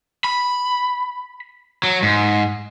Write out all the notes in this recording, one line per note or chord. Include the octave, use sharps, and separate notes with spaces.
B5
F#3
G#2